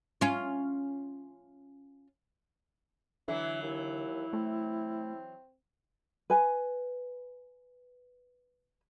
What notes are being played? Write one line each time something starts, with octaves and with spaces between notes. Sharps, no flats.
C#4 F4
D3 E3 F#3 E4
D#2 E4
A3 C4
B4 G#5